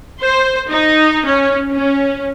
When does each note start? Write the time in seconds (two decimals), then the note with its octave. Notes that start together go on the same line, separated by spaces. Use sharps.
0.19 C5
0.69 D#4
1.24 C#4
1.73 C#4